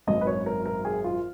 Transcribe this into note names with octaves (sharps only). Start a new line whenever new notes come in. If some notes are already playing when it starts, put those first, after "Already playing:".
G#1 F#2 D#3 D#5
B4
C#5
A#4
A#4
G#4
F4